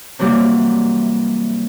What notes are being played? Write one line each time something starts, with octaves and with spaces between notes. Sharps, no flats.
C3 E3 F#3 G3 A#3 G4